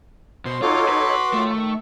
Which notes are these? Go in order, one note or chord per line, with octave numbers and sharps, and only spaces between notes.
B2 C5 C6
D#4 F4 F#4 A4 C#5 C6 D6
B4
D#3 F#3 A3 F4
D#3 C#6